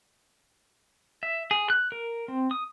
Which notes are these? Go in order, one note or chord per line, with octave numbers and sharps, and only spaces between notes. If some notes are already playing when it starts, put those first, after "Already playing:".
E5
G#4
F#6
A#4
C4
D#6